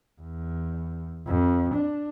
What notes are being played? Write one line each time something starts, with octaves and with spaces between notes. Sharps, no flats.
E2
F2
D4